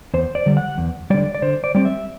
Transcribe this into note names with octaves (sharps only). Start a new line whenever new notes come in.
E2 C5
D5
D3 G3
F#5
E2
D3 G3 D5
D5
D3 C5
D5
G3 C4 D5
E5